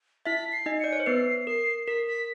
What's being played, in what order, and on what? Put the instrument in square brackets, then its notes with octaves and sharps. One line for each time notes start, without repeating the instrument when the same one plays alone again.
[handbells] E4 E5 [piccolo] B6
[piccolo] C7
[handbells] D#4 D#5
[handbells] D5 [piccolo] C#7
[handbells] C#5
C5
[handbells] B3 B4 [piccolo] C7
[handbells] A#4 [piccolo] C7
[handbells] A#4 [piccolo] B6
[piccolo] B6